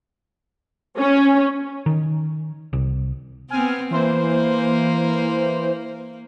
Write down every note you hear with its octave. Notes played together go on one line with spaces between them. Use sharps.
C#4
D#3
C2
B3 C4 G#5 F6
E3 A#3 C5